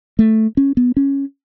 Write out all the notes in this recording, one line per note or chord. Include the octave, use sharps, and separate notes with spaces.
A3
C#4
B3
C#4